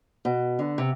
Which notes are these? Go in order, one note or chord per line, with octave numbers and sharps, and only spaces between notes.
B2
D3
C3